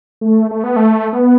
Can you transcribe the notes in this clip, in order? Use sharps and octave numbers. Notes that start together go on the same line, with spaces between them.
A3
A3
B3
A3
B3